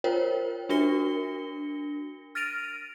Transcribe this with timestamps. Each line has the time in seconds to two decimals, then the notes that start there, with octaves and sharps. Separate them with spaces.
0.04 F4 A#4 C5 C#5 G5
0.69 D4 F#4 A#4 A#6 C#7 G7
2.35 F6 A6 A#6 D7 D#7 F7